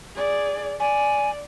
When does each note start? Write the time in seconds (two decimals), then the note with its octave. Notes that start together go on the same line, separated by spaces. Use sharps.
0.15 G#4 D5
0.80 D5 G#5